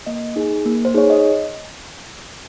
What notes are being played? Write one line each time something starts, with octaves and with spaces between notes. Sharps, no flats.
A#3 D#5
D#4 G#4
A#3
C5
D#4 G#4 C#5
D#5